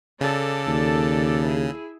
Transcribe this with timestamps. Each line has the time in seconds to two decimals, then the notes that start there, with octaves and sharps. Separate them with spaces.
0.21 C#3 A4 D5 A5
0.67 D#2
1.45 E4 G#4